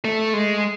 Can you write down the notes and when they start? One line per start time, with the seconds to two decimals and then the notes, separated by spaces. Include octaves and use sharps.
0.05 A3
0.33 G#3